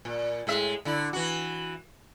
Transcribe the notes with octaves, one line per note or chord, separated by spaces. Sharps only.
A#2
A2 G#3 E5
D3 E4
E3 F#4